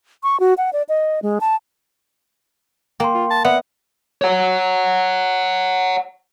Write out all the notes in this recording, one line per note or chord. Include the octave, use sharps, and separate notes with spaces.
C#6
F#4
F#5
D5
D#5
G#3
A5
A#3 G5 C6
F4
A5
B3 D5 E5 F#5
C#5 F#5